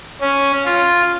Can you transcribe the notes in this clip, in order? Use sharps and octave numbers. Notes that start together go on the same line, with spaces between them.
C#4
F4